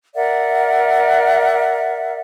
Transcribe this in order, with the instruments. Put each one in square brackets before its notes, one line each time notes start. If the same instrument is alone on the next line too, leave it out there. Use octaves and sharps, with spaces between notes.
[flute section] A#4 D5 E5 F#5